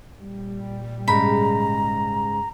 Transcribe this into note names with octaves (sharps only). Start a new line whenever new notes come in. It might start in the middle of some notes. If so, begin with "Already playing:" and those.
A#2 G3
G#2 C#3 G#3 A#5 B5